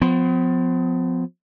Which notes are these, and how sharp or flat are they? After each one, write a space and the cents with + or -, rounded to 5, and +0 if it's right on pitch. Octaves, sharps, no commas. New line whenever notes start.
F3 +25 B3 +45